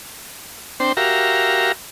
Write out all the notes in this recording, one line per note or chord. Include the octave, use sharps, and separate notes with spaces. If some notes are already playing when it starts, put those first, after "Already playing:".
C4 D4 C5 G5
F#4 G4 A#4 E5 F5 A#5